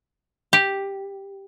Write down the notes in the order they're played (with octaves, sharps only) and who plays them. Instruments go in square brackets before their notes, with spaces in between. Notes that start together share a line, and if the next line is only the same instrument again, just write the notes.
[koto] G4